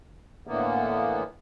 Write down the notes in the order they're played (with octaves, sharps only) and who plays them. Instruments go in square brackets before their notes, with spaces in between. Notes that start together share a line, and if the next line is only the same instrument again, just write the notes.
[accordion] A2 D3 E3 A#3 B3